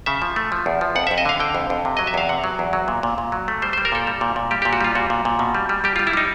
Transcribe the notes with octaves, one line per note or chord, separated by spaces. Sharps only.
C#3 E5
F3
A3
F3
E2
F3
F2 F#5
E5
F2
D#5
D3 F5
D3 G5
F2
F2
C3
F#3 D#5
E5
E2 F5
C3 F#5
F#3
E2
F#3
A#2
A#2
A#2
F#3
A3
G3 C5
C5
G3
A#4
A#2 A4
G3
A#2
A#2
G3 G4
G4
A#2
F#4
G3 F4
A#2 F#4
A#2
A#2
B2
G3
G3
G3 G4
F4
G3
E4
G3 D#4